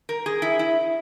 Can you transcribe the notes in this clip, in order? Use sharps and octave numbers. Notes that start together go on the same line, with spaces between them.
A#4
G#4
E4
E4